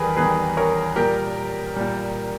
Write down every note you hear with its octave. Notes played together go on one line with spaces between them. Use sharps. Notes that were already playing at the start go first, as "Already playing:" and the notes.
Already playing: E2 D#3 G3 G#4 A#4 B4
E2 D#3 G3 G#4 B4
A#4 C#5
A#2 G3 G4 A#4
A#2 G3